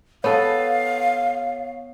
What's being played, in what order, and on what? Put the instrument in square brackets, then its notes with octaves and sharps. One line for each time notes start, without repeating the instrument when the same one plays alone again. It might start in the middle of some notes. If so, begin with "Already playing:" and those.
[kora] B3 A4 [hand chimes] C#5 [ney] F5